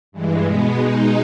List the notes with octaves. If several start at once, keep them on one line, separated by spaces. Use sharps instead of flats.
G2 E3 G#3
B2 G#3 B3
B2 G#3 D#4